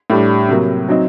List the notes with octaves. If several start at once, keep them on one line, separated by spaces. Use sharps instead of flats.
A2 G3 D4
C3 F#3 A#3
F#3 C4 D#4